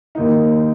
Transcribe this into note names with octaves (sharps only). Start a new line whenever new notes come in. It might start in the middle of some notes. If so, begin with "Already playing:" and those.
D#2 D#3 A#3 D#4